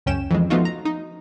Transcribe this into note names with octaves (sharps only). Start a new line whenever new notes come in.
C#2 F#2 C#4 G5 E7
F2 E3 G#3
F3 A3 B3 D#4 F4 F#4
A#5
D#4